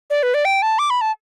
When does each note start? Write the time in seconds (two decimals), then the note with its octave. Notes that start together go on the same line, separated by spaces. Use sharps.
0.10 D5
0.23 B4
0.34 D5
0.45 G5
0.62 A5
0.79 D6
0.90 B5
1.01 A5